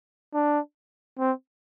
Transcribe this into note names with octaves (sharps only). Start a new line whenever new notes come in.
D4
C4